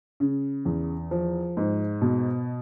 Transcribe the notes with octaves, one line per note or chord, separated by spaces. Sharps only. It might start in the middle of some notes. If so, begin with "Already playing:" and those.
C#3
E2
F3
G#2
B2